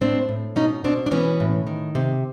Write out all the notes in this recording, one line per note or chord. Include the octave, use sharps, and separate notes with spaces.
A2 C4 D4
A2
B2 C#4 D#4
B2 C4 D4
D4
E3 B3 C#4
A2
D#3
C3